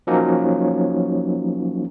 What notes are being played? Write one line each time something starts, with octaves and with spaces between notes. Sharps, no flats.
F3 F#3 A#3 C#4 D#4